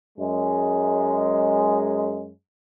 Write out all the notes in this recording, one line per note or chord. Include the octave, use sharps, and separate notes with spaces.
F#2 G#3